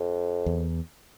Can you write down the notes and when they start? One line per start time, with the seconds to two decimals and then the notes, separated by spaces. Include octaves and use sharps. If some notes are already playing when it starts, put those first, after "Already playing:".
Already playing: F2
0.46 E2